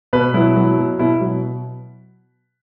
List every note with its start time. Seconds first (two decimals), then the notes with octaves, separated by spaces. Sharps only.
0.13 B2 B4
0.34 F#3 E4
0.56 F#3
0.78 B2
0.99 B2 E4
1.21 F#3